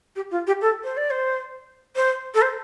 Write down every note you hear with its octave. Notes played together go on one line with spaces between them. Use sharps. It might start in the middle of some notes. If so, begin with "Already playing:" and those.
G4
F4
G4
A4
C5
D5
C5
C5
A4
C5